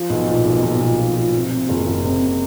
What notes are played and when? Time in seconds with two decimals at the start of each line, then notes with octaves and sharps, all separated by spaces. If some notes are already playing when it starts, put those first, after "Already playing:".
Already playing: F3
0.10 B1
0.27 A#2
0.45 B1
0.63 B1
0.81 A#2
0.98 F3
1.16 A#2
1.34 C3
1.51 C3
1.69 F#1
1.87 F#1
2.04 C3